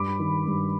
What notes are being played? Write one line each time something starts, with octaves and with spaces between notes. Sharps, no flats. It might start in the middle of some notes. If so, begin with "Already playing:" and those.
Already playing: G2 B5 D6
D#3
G2